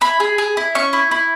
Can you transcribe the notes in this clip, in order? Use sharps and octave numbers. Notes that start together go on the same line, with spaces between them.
E4 B5
G#4
G#4
E4
C#4 C#6
E4
E4